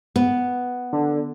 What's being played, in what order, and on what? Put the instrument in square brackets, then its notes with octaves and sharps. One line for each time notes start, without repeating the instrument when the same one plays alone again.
[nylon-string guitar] B3
[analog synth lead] D3